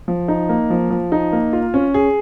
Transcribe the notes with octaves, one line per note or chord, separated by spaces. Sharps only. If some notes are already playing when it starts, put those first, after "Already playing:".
F3
D#4
A#3
F3
F3
D#4
A#3
F4
C#4
G#4